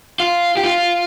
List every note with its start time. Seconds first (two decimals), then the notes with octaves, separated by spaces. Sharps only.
0.20 F4
0.57 G4
0.63 F4